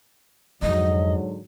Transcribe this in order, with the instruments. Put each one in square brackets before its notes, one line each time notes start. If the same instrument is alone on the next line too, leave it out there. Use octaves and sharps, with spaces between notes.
[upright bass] F2 [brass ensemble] G#2 D3 F#3 [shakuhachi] D#5